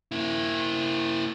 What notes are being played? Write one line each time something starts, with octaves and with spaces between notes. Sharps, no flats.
A#3 E4